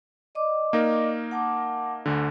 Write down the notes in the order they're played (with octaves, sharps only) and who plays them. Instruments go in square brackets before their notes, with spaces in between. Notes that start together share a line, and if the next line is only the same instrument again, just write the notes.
[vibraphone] D5 D#5 D6
[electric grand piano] A#3 D#4 A#4
[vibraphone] F#5 A5 D6
[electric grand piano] D2 D3